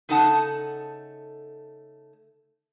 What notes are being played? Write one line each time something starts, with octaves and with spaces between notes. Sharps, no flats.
C#3 A3 D#4 A4 F#5 A5